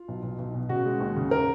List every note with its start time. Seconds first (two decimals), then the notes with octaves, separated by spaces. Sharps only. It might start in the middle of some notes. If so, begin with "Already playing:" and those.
Already playing: F4
0.08 B1
0.23 B1
0.38 B1
0.54 B2
0.69 C#3 F#4
0.86 G#3
1.00 D#2
1.16 C#3
1.31 A#4